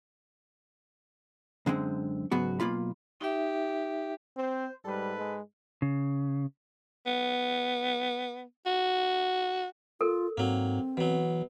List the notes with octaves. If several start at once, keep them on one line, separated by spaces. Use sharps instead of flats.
F#2 D3 G#3 C4
C#2 G#2 F#3 B3 F#4
B1 A#3 F4 B5
D#4 G4 E5
C4 C5
G#2 G3 A4 B4
G#3
C#3
B3
F#4
F4 A4 A#4
G#2 F#3 A#3 C4
B2 E3 F#3